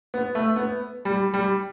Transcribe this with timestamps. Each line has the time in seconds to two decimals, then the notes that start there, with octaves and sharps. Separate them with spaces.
0.14 B3
0.35 A3
0.56 B3
1.05 G3
1.34 G3